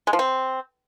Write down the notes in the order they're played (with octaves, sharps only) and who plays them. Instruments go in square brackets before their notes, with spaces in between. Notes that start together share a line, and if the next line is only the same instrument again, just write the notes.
[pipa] G#3
F3
C4